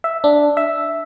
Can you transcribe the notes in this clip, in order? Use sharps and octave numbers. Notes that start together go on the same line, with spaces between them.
E5
D4
E5